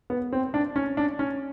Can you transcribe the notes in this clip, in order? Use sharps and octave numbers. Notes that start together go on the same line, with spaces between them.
B3
C4
D4
C#4
D4
C#4